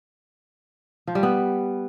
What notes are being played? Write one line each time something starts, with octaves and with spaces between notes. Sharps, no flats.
F3
G3
B3